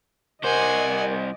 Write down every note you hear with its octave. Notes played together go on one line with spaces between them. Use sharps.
C2 A#4 C5 D5 D#5 F#5 G#5